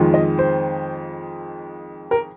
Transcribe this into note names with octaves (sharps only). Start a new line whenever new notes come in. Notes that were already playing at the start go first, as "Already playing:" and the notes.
Already playing: F2 D#3 G#3 F4
D#5
C5
A#4